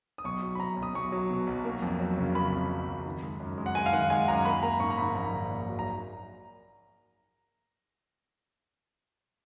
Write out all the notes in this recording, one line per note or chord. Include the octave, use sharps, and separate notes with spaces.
D#6
B1 C#6
F#3
B5
B1 A#5
B1
D#6
B1 C#6
F#3
B2
B1
A#3
F2
F#3
C#3
A#3 B5
F2
F#3
F2
D#3
G#3
F#2
G#3
F#5
G#3 G#5
F5
D#3 F#5
G#3 G#5
F#2 A#5
A#3 B5
A#3 A#5
G#2 C#6
A#5
G#2 B5
A#1 A#5
A#1
A#1
F#3
A#5